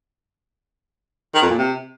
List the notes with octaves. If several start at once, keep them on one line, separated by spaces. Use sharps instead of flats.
D#3
F2
A#2
C3